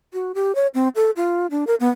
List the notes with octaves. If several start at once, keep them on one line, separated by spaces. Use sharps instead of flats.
F#4
G4
C#5
C4
A4
F4
D4
A#4
B3